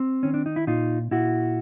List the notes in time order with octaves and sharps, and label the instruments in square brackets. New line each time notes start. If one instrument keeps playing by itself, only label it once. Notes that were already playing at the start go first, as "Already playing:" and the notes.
Already playing: [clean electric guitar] C4
D#3 C#4
D4
D#4
E4
A#2 D#4 F4
A#2 E4 F#4